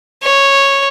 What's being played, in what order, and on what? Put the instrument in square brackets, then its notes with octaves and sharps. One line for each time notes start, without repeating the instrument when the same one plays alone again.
[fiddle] C#5